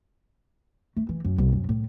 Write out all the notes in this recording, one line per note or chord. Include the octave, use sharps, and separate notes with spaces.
A3
E3
F#2
C2
F#2
A2